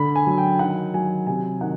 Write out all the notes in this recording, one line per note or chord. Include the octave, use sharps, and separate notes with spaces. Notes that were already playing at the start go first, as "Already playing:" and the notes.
Already playing: D3 B5
G#5
F#3
G5
D#3 F#5
F#3 G#5
C3 G#5
D#3 F#5